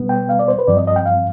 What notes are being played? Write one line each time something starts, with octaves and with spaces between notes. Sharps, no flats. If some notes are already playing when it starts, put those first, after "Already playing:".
Already playing: B2 G3 B3
G5
F5
D5
C5
B4
G2 F3 C4 D5
D#5
D#5
G5
F5